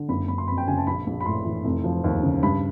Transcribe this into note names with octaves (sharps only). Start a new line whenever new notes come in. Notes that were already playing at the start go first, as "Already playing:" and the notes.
Already playing: D3
F#1 B5
F#1 B5
C6
F2 B5
G5
C#3 G#5
A5
A#1 B5
A#1
B5
A2 C6
E3
F1
F3
D#2
C#3
G2 B5